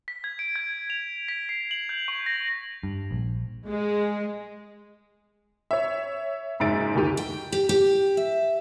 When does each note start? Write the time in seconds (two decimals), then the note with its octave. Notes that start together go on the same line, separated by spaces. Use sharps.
0.08 B6
0.24 G#6
0.39 D7
0.56 G#6
0.90 F7
1.28 B6
1.49 C7
1.71 F#7
1.89 G6
2.08 C#6
2.26 A#6
2.83 G2
3.11 A#1
3.67 G#3
5.71 C#5 E5
6.60 F#1 G#2 G#3 E5 A6 D7
6.95 D2 D#3 G4 D#7
7.17 G5
7.52 G4
7.69 G4
8.17 E5